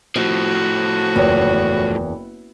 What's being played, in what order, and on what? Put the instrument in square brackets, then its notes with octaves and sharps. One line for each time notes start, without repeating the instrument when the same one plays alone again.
[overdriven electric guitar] A2 F3 [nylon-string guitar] C4 [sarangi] F#4
[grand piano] F#1 C#5 G5 [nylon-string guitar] E2